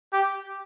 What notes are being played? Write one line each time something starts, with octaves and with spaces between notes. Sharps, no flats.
G4